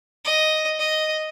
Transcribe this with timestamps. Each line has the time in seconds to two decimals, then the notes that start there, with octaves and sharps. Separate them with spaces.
0.25 D#5
0.79 D#5